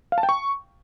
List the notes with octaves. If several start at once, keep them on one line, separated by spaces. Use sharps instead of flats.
F5
A5
G5
C#6